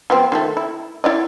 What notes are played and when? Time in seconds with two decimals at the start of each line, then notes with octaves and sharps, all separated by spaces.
0.10 F3 B3 C4
0.32 D#3 G#3 A3
0.57 E4
1.04 E4 D5 D#5